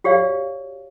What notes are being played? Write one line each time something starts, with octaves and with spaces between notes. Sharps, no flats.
F#4 G4 C#5 D5 F5